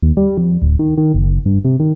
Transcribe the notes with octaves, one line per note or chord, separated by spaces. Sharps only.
D#2
G3
F2
D1
D#3
D#3
F#1
G2
C3
D#3